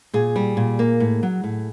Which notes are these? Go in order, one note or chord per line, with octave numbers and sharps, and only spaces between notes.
A#2 G#4
G3
A#2
A#3
A2
F#3
A2